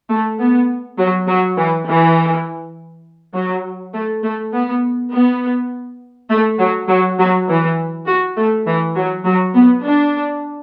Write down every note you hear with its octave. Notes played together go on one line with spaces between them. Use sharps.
A3
B3
F#3
F#3
E3
E3
F#3
A3
A3
B3
B3
A3
F#3
F#3
F#3
E3
F#4
A3
E3
F#3
F#3
B3
D4